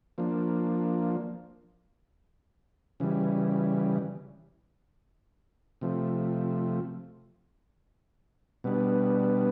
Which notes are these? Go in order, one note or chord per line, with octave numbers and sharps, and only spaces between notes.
F3 A#3 D4
C#3 E3 G3
C3 F3 A3
B2 G3 B3 D4